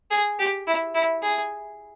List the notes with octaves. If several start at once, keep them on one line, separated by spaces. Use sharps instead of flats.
G#4
G4
E4
E4
G#4